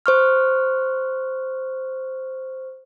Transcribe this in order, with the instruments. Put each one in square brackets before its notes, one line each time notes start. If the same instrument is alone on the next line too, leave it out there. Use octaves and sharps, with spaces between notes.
[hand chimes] C5 C#6 F6